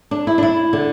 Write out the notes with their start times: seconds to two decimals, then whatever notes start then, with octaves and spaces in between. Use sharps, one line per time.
0.11 D4
0.27 E4
0.38 D4
0.43 E4
0.73 D3